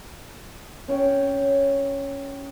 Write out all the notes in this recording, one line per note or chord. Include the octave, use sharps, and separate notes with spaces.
C#4 C#5 G5